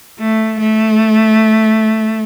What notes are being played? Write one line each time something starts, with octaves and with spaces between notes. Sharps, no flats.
A3
A3